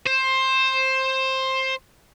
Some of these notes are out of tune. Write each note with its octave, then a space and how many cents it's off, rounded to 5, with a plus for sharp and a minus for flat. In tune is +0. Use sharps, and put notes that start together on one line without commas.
C5 +15